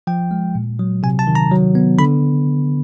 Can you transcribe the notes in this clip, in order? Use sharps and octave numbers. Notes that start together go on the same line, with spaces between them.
F3 G5
G#3
A#2
F#3
C3 G#5
A5
D#3
A#5
F#3
B3
D3 B5